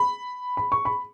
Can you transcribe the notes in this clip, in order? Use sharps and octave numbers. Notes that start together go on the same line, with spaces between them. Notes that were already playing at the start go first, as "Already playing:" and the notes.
Already playing: B5
B5
C#6
B5